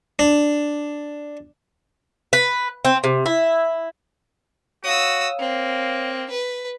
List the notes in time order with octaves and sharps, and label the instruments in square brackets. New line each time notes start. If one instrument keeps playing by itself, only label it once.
[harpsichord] D4
[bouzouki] B4
C4
C3
E4
[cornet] F#4 [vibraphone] C#5 F5 [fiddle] D#6 E6
[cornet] A#3 [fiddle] C4
[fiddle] B4